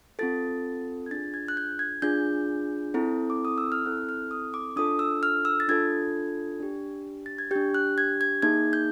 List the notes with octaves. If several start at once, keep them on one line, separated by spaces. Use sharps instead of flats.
C4 F4 A4 A6
G#6
D4 F4 G#4 A6
G#6
F#6
G6
G#6
D4 F4 G#4 G6
C4 E4 A4
D6
D#6
E6
F6
C4 E4 A4 F#6
F6
D#6
D6
D4 F4 A4 D#6
E6
F6
E6
A6
D4 F4 A4 G#6
D4 G4
A6
G#6
D4 G4 G6
F#6
G#6
G#6
A#3 D#4 G#4 G#6
G6